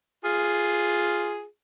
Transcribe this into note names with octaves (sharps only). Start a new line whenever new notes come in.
F4 G#4